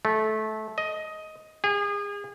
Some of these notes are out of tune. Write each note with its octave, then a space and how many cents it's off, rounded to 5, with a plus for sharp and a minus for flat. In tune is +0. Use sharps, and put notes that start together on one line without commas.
A3 -20
D#5 +10
G#4 -35